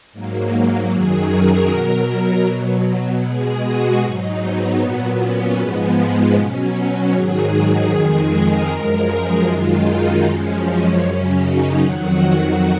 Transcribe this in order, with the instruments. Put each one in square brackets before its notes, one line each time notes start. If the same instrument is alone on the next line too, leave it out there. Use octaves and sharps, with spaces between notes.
[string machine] G#2 F#3 A#3
F#2 D#3 F#3 G#4
A#4
B2 F#3
B2 F#3
B2 G#3 G#4
F#4
G#2 F#3 D#4
B3
A#2 F#3 B3
C#4
G#2 F3 G#3 B3
B2 F#3 C#4
G#2 D#3 F#3 G#4
F2 D#3 G#3
A#4
F#2 F3 G#3
G#4
F#2 D#3 G#3 F4
D#4
F#2 F3 G#3 C#4
F#2 C#3 F#3
D#4
F2 D#3 F#3 F#4